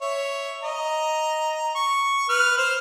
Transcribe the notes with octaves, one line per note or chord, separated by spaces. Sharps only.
C#5 E5
D#5 A#5
C#6
B4 F6
C5 F6